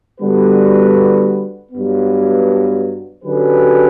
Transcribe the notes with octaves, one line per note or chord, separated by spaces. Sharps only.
D3 G3 B3 F#4 B4
G2 F#3 B3
D3 F#3 C#4 G4 B4